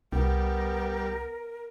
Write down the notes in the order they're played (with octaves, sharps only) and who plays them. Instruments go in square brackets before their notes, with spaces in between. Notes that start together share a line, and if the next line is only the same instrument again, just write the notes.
[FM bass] C2 [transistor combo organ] G3 [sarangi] B3 [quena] A#4